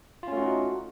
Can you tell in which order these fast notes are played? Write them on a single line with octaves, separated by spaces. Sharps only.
F4 C#4 A3 F#4 D#4